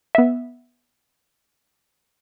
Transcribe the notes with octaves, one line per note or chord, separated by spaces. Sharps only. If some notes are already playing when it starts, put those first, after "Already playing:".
B3 E5